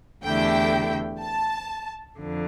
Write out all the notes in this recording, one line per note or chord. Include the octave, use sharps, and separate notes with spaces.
E2 D3 A3 E4 G4 G5
A5
F2 D3